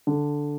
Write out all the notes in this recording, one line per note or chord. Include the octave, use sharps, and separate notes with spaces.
D3